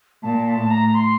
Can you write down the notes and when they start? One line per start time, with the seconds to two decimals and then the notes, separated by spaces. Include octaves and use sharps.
0.23 A#2 A5
0.46 A5
0.54 A2
0.70 A#5
0.94 C6